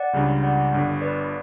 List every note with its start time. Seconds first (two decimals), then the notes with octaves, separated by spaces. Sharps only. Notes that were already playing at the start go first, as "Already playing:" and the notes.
Already playing: D5 F#5
0.13 C#2 C#3 G3 D4
0.43 D5 F#5
0.73 G1 G2 D3
1.01 B4 D5